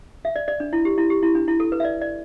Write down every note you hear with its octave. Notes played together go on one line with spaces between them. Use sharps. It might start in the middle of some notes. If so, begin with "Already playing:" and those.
E5
D5
D5
D4
E4
G4
E4
G4
E4
D4
E4
A4
B4
E5
D5
D5